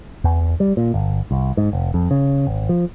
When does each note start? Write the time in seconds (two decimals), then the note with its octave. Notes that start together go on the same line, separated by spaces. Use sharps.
0.24 E2
0.60 G3
0.77 A#2
0.94 G1
1.31 C2
1.57 G#2
1.73 F1
1.94 F2
2.11 C#3
2.47 G#1
2.69 F3